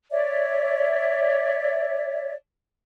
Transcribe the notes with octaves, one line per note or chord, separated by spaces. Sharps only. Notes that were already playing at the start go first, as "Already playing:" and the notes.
C#5 D5 E5